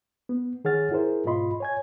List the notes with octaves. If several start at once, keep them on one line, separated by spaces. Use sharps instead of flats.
B3
D#3 G#4 C#5 F#5 F6 A6
E4 G#4 A#4 C5
G#2 B2 F4 D#5 B5 C6
C#5 G#5 G#6